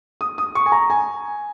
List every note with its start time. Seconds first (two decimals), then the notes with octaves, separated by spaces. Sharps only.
0.21 D#6
0.38 D#6
0.55 C#6
0.66 G#5
0.72 A#5
0.90 G#5